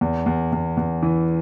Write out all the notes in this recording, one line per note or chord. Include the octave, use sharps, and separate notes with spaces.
E2
E2
E2
E2
E3